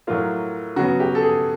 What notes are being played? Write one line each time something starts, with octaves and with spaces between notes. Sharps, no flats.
A2 F#3 A#3 F4
C#3 F#3 B3 F#4
G4
A4
G#4